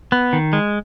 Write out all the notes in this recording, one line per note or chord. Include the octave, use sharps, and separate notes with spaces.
B3
D#3
G#3